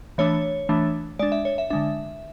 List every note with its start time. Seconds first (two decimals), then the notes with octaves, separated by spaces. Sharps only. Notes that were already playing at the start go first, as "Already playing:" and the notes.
0.18 E3 A3 D4 C#5
0.69 E3 A3 D4
1.19 G#3 D4 D5
1.32 E5
1.45 C#5
1.58 E5
1.70 D3 G#3 D4 E5